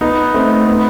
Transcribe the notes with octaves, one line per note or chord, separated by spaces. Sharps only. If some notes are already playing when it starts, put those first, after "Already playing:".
B3 D#4
A3 C4
B3